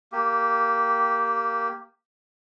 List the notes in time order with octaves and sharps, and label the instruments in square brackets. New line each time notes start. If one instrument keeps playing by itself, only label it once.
[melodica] A#3 G4